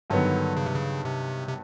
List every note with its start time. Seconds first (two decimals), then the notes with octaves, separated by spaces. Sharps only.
0.10 G2 D3 D#3 F#3 B3
0.57 C#3
0.66 C3
0.75 C#3
1.05 C3
1.48 C3